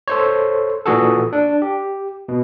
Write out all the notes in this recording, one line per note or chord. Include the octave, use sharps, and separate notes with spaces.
A4 C5 C#5
A#2 E3 F#4 G#4 A4
D4
G4
B2